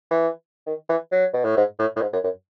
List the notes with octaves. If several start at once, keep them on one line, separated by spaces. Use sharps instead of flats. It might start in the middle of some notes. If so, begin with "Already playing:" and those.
E3
D#3
E3
F#3
B2
A2
G#2
A2
A2
G#2
F#2
F#2